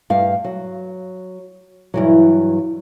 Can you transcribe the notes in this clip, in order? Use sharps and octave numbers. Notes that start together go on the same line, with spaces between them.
G2 F5
F#3
G2 E3 F#3